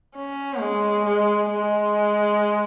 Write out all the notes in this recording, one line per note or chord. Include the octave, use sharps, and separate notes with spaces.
C#4
G#3
G#3
G#3